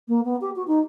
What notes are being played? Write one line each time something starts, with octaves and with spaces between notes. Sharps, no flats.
A#3
B3
G4
F#4
D#4